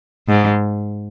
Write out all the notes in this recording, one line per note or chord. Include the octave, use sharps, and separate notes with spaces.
G#2